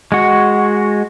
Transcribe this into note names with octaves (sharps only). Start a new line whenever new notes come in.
G#3 F#4